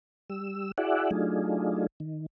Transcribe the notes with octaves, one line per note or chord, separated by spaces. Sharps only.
G3 E6
E4 F#4 G#4 D5 E5 F#5
F#3 A3 D4 D#4 F4 G#4
D#3